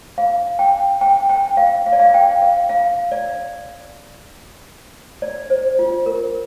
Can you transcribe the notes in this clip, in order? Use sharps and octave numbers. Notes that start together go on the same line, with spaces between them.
F5
G5
G5
G5
F5
F5
D5
F5
G5
F5
F5
D5
D5
C5
F4
A#4